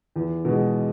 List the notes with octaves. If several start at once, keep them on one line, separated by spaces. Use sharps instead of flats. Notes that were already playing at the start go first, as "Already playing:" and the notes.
E2
B2 G#3